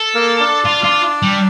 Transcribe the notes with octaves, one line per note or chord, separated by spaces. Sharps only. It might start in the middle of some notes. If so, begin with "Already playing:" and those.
Already playing: A4
A#3 A#4
D4 D5
F4
F4
G3